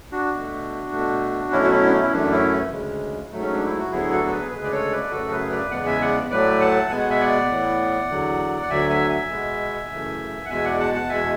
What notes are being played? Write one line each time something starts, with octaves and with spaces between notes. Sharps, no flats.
D4 F#4
B2 A3
B2 A3
B2 F#3 A3 C#4 E4
F#4
C#4 E4
D4
C#4
E4
F#2 E3 A3 D4
C#4 E4
D2 C#3 G#3
G#2 F#3 A3
C#4
D4
E4
F#4
D2 D3 F#3 B3 E4 G#4
F#4 A4
A4
G#4 B4
D2 C#3 G#3 G#4 B4
D5
A4 C#5
B4 D5
F#2 C#3 F#3 A3 F#4 A4
G#4 B4
B4 D5
E2 C#3 G#3 B3 D5 F#5
E5 G#5
D5 F#5
A2 F#3 A3 B4 D5
F#5 A5
B2 G#3 B3 G#5
F#5
E5 G#5
D5 F#5
A2 E3 B3
E2 D3 F#3
F#5
D2 D3 F#3 E5 G#5
E5 G#5
E5 G#5
B2 G#3 B3
F#2 C#3 E3 A3
F#5
E2 B2 G#3 E5 G#5
D5 F#5
F#5 A5
F#5 A5
E2 B2 G#3 E5 G#5